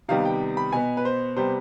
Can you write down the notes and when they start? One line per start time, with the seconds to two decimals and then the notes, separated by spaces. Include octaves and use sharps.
0.09 C3 D#3 G3 B3 F5
0.25 G5
0.57 B5
0.73 B2 B3 G#5
0.97 B4
1.05 C5
1.36 C3 G3 B3 C5